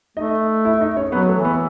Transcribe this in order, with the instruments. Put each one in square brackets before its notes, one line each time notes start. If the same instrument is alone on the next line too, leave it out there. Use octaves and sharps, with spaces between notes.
[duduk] A3 [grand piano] D#4 D#5
[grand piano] E4 E5
D#4 D#5
C#4 C#5
[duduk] F#3 [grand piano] B3 B4
[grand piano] A3 A4
[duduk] E3
[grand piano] B3 B4